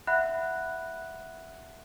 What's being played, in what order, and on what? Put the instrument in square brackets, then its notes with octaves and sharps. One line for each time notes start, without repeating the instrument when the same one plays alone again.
[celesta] E5 F#5 B5 F#6